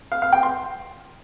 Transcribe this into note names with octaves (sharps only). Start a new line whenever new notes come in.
F5
F5
G5
C6